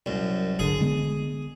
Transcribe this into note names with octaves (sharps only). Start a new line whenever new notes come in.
C2 F#2
G#1 D3 G#4
D3 G#3 B3